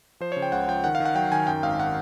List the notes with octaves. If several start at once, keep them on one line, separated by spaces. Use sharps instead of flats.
F3 C5
C#3 C#5
G5
C#2 F#5
F3 G5
D#3 F#5
F5
D#3
F#5
F#3 G5
D#3 G#5
F#2 G5
G#1 F5
F#5